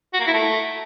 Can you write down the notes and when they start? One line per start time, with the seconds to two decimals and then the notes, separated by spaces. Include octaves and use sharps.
0.13 F#4
0.20 A#3
0.27 E4
0.34 A3